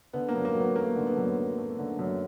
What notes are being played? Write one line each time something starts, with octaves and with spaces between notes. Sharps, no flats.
D3 B3
A#3
F#2
A#3
F#3
B3
A3 A#3
D3
B3
F#2
F#3
A3
D3
F#2